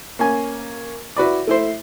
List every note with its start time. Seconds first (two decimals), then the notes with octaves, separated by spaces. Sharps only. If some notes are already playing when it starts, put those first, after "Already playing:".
0.19 A#3 C#4 G#5
1.16 E4 F#4 B4 D5
1.47 A3 E4 C5